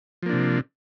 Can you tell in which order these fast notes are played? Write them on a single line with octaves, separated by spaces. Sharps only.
F3 A#3 D4 C3